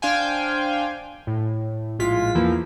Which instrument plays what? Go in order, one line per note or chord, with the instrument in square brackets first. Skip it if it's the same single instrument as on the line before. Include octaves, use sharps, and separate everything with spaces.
[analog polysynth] D4 C5 F5 G5 G#5
A2
A#1 A2 G#3 F4 B6
E2 E3 F3 A#3